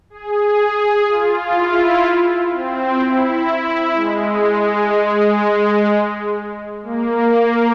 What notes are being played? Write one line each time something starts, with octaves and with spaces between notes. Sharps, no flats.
G#4
F4
E4
C4
E4
G#3
G#3
G#3
A#3